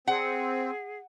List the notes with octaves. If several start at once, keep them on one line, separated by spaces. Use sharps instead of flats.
C4 G#4 F#5